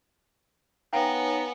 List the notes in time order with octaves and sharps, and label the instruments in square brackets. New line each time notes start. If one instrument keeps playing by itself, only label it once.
[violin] B3 [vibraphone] D#4 C#5 G#5 [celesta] F5 G5 [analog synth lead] A#5